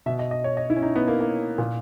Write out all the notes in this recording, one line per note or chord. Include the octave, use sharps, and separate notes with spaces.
B2 E5
D#5
D#5
C#5
D#5
E4
C#4
D#4
B3
A#3
A#3
A#2